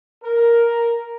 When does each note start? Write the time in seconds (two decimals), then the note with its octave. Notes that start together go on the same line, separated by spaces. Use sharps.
0.24 A#4